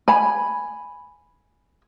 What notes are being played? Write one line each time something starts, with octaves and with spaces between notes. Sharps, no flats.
G#5 B5